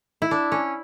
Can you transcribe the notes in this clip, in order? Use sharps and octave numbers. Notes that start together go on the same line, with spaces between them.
E4
D4
C#4